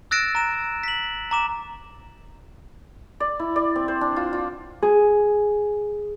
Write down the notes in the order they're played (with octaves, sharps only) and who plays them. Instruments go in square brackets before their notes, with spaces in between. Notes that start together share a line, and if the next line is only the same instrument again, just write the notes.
[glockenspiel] E6 F#6 A6 A#6 D7 E7
A#5 E7
B6 F#7
A#5 D6 E7
[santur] D5
E4
D5
C4
C5
D4
F4
F4
[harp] G#4